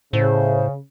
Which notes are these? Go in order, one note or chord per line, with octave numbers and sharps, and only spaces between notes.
A2 C#3 C5